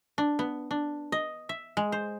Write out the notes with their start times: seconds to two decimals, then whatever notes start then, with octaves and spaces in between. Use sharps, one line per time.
0.18 D4
0.39 B3
0.71 D4
1.12 D#5
1.49 E5
1.77 G#3
1.92 C5